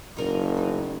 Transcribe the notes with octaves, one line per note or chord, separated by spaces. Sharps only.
F#1 D#4 A#4 D5
D2 D#4